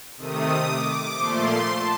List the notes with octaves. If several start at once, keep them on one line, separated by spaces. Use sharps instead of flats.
C3 D#3 A3 D#6
D6
A#2 F3 A3 C6
A5